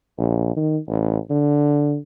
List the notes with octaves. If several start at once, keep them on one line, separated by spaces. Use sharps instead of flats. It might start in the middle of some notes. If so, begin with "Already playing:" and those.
A#1
D#3
A1
D3